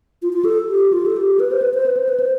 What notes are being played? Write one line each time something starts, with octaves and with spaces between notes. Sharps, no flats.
F4
F4
A4
G4
F4
A4
G4
B4
C5
B4
C5
B4
C5
B4
C5